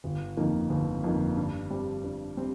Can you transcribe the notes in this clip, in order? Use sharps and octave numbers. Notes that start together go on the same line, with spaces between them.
G1
F2 D#3 A#3
G1
F2 D#3 A#3
G2
G3 C4
G2
G3 C4